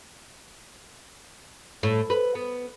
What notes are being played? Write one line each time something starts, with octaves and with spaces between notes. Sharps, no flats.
A2
B4
B3